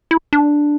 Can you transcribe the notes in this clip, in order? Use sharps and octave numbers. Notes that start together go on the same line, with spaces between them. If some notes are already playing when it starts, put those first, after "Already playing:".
E4
D4